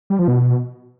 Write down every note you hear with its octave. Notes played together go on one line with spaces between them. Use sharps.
G3
F3
B2